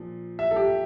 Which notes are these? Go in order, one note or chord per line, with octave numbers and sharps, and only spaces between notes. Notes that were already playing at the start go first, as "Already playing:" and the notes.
Already playing: A#2 F3
E5
A4
G4